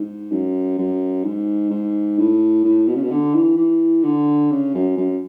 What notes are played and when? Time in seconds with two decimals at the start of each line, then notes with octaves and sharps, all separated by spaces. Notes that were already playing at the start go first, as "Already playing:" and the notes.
Already playing: G#2
0.32 F#2
0.78 F#2
1.24 G#2
1.71 G#2
2.18 A2
2.64 A2
2.88 B2
2.96 C#3
3.03 B2
3.11 D3
3.34 E3
3.57 E3
4.03 D3
4.51 C#3
4.75 F#2
4.97 F#2